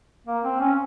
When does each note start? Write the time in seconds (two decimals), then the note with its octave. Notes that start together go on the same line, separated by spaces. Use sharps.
0.27 A#3
0.44 C4
0.60 C#4